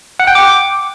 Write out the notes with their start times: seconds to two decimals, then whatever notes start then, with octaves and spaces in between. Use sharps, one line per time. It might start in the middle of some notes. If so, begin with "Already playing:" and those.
0.20 F#5
0.27 G5
0.35 D6